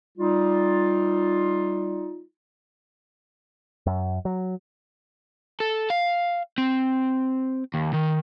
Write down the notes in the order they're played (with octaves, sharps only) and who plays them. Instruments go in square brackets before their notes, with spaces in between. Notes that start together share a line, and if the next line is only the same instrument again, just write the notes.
[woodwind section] G3 D#4 F4
[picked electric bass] F#2
F#3
[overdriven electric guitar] A4
F5
C4
D#2
D#3